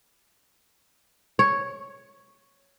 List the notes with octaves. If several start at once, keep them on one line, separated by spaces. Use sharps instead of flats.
C#5